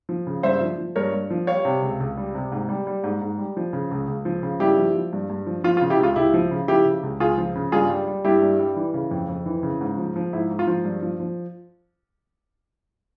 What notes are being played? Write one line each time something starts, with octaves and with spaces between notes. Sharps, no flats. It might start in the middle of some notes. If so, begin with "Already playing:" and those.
F3
C#3
G2 C5 E5
F3
F3
G2 A#4 C#5
G2
F3
G3 C#5 F5
C3
C#2
C#2
G3
C3
G#2
G3
G3
G#2
G#2
G3
F3
C#3
C#2
C#2
F3
C#3
G2 E4 G4
F3
F3
G2
G2
F3
F3 F4
F4
C#3
E4 G4
C#2 F4
C#2 E4 G4
F3
C#3
F3 E4 G4
C#3
C#2
C#2 F4 G#4
F3
C#3
G2 F4 G#4
G3
G3
G2 E4 G4
G2
G3
E3
C#3
F2
F2
E3
C#3
G#2
F3
F3
G#2 E4
G#2
F4
F3
G2
F3
F3